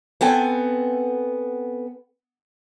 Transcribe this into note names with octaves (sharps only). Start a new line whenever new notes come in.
B3 C4 A4 G#5